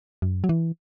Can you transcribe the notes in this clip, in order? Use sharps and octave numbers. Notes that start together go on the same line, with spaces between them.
F#2
F#3
E3